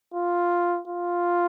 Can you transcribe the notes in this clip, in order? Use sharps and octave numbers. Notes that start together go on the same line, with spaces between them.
F4
F4